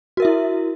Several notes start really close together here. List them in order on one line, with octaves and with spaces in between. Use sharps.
F#4 A#4 E5 E4